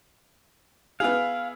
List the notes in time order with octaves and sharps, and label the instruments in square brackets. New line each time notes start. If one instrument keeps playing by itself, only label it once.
[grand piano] B3 E4 G#4 [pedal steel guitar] F5